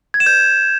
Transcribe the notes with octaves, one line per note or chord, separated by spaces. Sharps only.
G#6
E7
G6